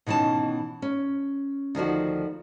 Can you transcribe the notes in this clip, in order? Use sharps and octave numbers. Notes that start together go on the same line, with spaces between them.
B2 D#3 E3 C#4 A5
C#4
D2 D#3 F3 F#4